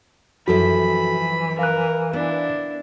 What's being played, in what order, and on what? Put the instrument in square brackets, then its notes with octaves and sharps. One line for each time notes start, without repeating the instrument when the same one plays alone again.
[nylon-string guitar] F#2 F3 E4 [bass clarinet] E3 [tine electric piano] F#4 A4 [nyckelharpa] B5
[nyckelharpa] A#4 [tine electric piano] F5 F#6
[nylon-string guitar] B3 [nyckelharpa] D4 E4